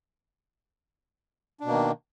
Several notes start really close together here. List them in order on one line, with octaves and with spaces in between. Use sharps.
D4 B2 A#3 D#3